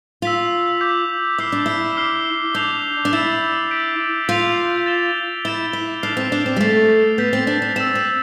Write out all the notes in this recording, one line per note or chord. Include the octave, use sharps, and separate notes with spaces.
F4 E6 B6 F7
D6 G6 B6
E4 D6 F6 C7 G7
D4
E4
D6 F6 C7 G7
D4 D6 G6 C7 F7
D4
E4 E6 A6 E7
G6 B6 D7
F4 G6 B6 F7
A6 E7 G7
E4 A6 E7 G7
E4
D4 F6 C7 F7
C4
D4
C4
G3
A3 A6 C7 F7
B3 G6 B6 F7
C4
D4
D4
C4 E6 A6 E7
C4